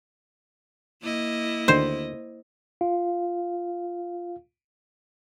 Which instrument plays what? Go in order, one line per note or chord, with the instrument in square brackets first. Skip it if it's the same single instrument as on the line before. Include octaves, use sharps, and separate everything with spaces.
[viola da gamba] A#3 E4 D#5
[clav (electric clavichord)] D2 D3 D#3 [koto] C5
[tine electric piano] F4 F5